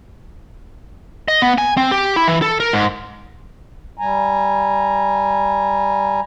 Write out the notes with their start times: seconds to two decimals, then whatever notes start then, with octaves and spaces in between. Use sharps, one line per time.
1.28 D#5
1.42 B3
1.58 G#5
1.77 C4
1.91 G4
2.16 E4
2.28 E3
2.42 A4
2.60 A#4
2.73 G#2
3.97 G3 G#5 A#5